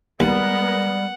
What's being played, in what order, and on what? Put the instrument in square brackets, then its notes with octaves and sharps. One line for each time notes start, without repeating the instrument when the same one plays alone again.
[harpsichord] D#2 [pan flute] G3 [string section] G#3 B3 A#4 [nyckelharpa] F#5